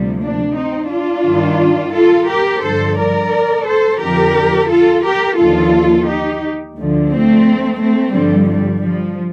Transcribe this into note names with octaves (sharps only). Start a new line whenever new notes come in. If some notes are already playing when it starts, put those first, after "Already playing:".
Already playing: D2 C3 F3 G3
A#3 D4
C4 D#4
D4 F4
G2 D#3
F4 A4
G4 A#4
G2 D3 F3 A4 C5
A#4 D5
A4 C5
F2 D3 F3 G4 A#4
F4 A4
G4 A#4
D#2 D3 F3 F4 A4
D#4 G4
D2 D3 F3
A3 C4
A3 C4
G2 D3 F3 G3
G3
F3